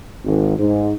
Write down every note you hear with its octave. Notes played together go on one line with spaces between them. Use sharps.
G#1
G#2